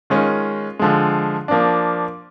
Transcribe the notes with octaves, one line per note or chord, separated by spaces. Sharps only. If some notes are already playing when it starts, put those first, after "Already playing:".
D#3 G#3 C#4 F4
D3 F3 G#3
F3 A#3 D4